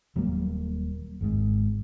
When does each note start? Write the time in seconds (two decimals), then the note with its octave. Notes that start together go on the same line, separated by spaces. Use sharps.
0.16 D#1 F#3 G3 A#3
1.21 G#1 G#2